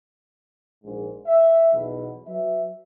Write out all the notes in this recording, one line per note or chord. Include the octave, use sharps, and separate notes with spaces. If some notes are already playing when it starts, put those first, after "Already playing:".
A#1 G#2
E5
B1 E2 B2
F#3 B4 E5